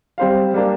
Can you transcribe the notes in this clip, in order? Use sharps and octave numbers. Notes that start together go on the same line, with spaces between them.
G3 C4 G4 C5 F5
G3 A#3 D4